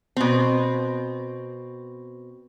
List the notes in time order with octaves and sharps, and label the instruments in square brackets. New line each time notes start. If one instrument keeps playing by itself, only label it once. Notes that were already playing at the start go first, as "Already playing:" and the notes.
[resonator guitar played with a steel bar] B2 C4